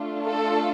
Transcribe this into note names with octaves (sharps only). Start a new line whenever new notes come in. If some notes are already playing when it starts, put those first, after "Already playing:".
Already playing: A3 D4 F4
A4